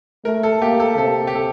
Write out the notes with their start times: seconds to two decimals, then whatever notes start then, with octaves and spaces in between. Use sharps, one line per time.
0.25 A3 A#4
0.43 A4
0.62 A#3 G4
0.80 A4
0.98 C3 A4
1.27 G4
1.35 A4